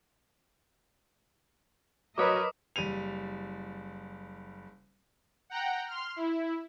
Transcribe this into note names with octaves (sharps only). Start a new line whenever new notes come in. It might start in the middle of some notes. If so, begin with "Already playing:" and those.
F#3 F#4 A#4 B4 C#5 D#5 D6 D#6
F#1 G3 D#7 F7
F#5 G5 A#5
C6 F6
E4